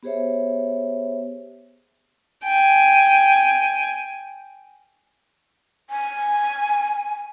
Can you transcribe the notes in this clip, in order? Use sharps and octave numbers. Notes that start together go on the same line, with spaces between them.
B3 G4 G#4 C5 C#5 E5
G5 G#5
G#5